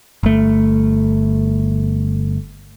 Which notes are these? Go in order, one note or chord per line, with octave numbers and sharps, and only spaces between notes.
G1 A3